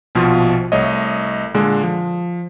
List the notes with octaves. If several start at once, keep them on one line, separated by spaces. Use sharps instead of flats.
A#1 B2 F3 F4
C2 A3 C#5 D#5
A#2 D3 G#3
F3